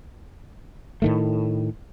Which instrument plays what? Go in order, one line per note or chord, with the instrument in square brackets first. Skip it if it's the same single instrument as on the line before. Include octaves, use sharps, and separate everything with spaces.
[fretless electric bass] A2 D#3 A3